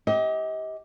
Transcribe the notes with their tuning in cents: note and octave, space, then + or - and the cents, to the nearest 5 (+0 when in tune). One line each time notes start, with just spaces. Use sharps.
G4 +0 D#5 +35